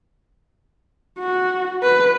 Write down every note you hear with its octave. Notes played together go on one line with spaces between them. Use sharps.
F#4
B4